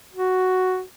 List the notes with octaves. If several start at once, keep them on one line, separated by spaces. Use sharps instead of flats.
F#4